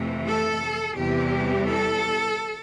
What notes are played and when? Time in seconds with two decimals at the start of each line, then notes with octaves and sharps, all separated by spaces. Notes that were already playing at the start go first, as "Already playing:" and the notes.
Already playing: F2 C3 E3 A3
0.27 A4
0.96 E2 C3 E3 G3 G4
1.67 A4